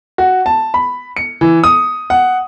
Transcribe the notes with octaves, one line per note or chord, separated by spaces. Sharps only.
F#4
A5
B5
C#7
E3
D#6
F#5